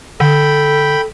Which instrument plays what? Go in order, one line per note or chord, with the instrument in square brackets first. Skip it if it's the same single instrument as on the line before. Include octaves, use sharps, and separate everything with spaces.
[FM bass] D3 [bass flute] A4 [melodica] G5 B5